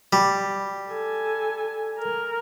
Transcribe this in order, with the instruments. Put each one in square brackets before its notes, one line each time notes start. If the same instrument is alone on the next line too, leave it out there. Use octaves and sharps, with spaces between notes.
[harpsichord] G3
[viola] A4 G#5
A#4